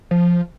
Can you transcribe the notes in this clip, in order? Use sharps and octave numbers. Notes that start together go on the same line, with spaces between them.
F3